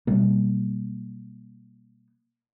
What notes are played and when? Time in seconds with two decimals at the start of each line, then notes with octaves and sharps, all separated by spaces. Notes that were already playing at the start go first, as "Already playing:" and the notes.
0.07 B2 F#3 G3 A#3